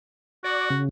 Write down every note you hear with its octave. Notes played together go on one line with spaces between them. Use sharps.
F#4 D5
C#3